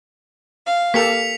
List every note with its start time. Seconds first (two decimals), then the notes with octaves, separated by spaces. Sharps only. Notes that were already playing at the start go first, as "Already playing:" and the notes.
0.64 F5
0.94 A#3 G4 A4 B6 C#7 F7